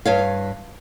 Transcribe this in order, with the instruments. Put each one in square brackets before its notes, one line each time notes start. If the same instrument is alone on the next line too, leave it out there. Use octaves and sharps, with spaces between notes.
[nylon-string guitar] G2 C#5 F5